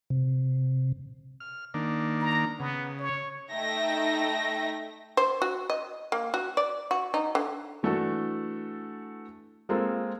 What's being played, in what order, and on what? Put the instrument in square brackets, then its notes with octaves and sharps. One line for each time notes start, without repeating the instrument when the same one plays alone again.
[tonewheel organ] C3
[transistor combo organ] F6
D#3 A#3 D4
[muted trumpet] A#5
[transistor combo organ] C#3 [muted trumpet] B3
[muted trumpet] C#5
[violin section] A3 D#4 E5 G5 A#6
[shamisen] C5
F#4
D#5
A#3
F#4
D5
F#4
D#4
D3
[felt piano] E3 A3 D4 F#4 A4
G#3 A#3 C4 F4 G#4 A4